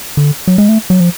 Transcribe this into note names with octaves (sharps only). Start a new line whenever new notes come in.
D3
F#3
G#3
A3
F#3
F3